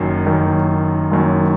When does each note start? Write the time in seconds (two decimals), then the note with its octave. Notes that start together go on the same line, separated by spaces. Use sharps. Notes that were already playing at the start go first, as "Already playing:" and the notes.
Already playing: F#1 F#2 D#3
0.26 F#1 F#2 D#3
1.11 F#1 F#2 D#3